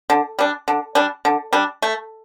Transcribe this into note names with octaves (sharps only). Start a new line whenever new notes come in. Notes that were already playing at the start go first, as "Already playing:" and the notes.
D3
G3 D4
D3
G3 D4
D3
G3 D4
A3